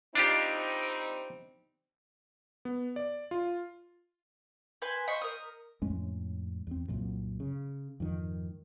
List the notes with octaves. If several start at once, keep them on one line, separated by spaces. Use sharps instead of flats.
G3 C4 D4 D#4 F4 G4
B3
D5
F4
B4 C5 G#5
C5 D#5 B5 C#6
A#4 D#6
F2 A2 G#3 C#4
E2 C4
C2 F#2 A#2
C#3
F2 G#2 D#3